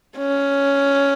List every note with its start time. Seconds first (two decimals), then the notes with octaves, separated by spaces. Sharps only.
0.18 C#4